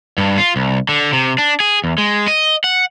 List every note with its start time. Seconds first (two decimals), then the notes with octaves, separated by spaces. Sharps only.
0.18 G2
0.38 F4
0.56 C2
0.89 D3
1.13 C3
1.38 D4
1.60 G#4
1.84 E2
1.98 G#3
2.28 D#5
2.64 F#5